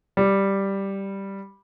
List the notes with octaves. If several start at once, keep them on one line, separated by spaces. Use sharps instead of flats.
G3